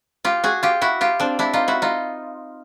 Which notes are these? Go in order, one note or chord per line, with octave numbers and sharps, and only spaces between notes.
F4 G4
F#4 G#4
F4 G4
E4 F#4
F4 G4
C4 D4
D4 E4
D#4 F4
E4 F#4
D#4 F4